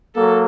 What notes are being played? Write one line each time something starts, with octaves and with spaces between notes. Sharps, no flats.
F#3 A#3 A4